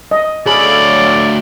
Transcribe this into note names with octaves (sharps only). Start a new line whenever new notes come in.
D#5
D2 G#4 A4 C#5 D5 F5 B5